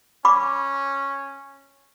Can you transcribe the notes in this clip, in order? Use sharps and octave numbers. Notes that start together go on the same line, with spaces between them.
C#4 B5 D6